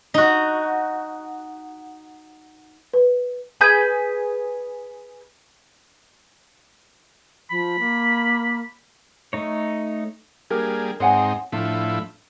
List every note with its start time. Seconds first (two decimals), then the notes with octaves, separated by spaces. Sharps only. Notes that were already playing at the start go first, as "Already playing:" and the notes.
0.14 D#4 F#4
2.93 B4
3.61 G#4 B4 G6
7.51 F3 B5
7.79 A#3
9.33 A3 D#4 C#5
10.50 G3 A#3 D4 G4 G#4 A#4
11.00 G#2 C4 D#4 C#5 F#5 G#5
11.52 A2 F3 D4 E4 F4